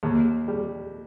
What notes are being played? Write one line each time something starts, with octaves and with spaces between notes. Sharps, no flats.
D#2
G3